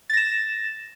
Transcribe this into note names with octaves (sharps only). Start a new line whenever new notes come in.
A6 A#6 E7